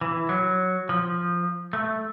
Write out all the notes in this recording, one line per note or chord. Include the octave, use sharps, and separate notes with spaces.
E3
F#3
F3
A3